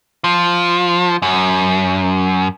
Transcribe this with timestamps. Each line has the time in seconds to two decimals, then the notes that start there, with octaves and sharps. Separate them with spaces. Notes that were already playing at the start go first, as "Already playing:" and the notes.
0.24 F3
1.22 F#2